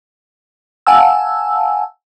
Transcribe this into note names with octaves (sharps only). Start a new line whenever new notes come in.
F5 F#5 G#5 A5 E6